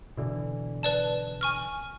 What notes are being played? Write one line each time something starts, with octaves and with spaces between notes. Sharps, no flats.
B2 D3 E3
B4 D5 A5
G#5 C#6 F6